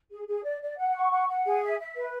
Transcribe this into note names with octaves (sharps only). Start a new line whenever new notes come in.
G#4
G#4
D5
D5
F#5
C#6
F#5
F#5
G#4
E5
E5
B4